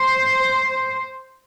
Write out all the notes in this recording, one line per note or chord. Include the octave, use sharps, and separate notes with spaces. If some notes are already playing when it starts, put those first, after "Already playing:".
Already playing: C5